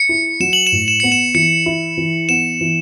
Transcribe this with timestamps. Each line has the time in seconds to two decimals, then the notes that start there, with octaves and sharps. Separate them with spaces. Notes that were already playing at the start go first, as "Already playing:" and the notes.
Already playing: C#7
0.09 E4
0.40 F#3 E7
0.53 F#7
0.67 E7
0.72 A2
0.88 E7
1.00 B3 C#7
1.12 E7
1.34 E3 C#7
1.66 E4
1.97 E3
2.29 B3 E7
2.61 E3